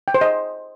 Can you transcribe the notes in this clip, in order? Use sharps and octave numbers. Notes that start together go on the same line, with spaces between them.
G5
C5
D#5